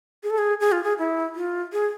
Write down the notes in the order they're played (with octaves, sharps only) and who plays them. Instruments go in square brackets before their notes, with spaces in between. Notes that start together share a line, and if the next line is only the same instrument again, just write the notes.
[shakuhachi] G#4
A4
G#4
G#4
F4
G#4
E4
F4
G#4